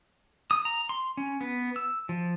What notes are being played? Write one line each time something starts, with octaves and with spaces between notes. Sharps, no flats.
D#6
A#5
C6
C#4
B3
E6
F3